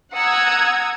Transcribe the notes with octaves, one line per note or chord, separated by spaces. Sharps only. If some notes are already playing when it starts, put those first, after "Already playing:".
F#5 A#5 D#6 E6 G#6